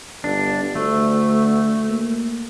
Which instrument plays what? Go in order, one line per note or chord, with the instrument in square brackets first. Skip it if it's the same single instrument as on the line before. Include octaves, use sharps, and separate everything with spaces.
[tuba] G1 [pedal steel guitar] D4
[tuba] D2 [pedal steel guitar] A3
[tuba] A#3